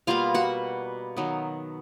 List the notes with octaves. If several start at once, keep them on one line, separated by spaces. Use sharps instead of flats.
B2 G3 A#3 F4 F5
F#4 F#5
D#3 F#3 B3